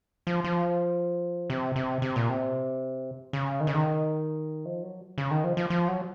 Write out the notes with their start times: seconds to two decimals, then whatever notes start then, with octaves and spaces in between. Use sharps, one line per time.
0.27 F3
0.44 F3
1.50 C3
1.76 C3
2.02 C3
2.16 A#2
2.29 C3
3.33 C#3
3.60 D#3
3.67 C#3
3.74 D#3
4.65 F3
4.83 F#3
5.18 C#3
5.31 D#3
5.44 F3
5.57 F3
5.70 F3
5.88 F#3